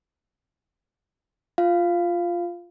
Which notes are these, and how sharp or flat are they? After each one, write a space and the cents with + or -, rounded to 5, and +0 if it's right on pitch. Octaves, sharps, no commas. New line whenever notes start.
F4 +0 F5 -10